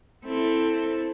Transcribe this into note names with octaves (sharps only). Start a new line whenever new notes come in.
C4 E4 A4